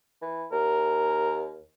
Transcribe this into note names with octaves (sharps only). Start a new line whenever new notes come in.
E3
D#2 A#4